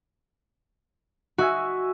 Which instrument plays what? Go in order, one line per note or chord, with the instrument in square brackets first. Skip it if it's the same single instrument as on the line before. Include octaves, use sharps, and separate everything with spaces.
[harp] F#4 [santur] D#5 E5 G#5